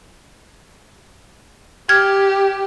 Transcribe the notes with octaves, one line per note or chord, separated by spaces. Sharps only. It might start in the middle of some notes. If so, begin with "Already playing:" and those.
G4 F6 G#6